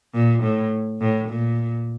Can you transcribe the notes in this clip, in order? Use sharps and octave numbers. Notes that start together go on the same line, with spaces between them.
A#2
A2
A2
A#2